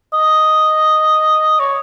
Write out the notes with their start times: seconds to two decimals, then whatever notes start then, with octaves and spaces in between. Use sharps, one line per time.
0.13 D#5
1.59 C#5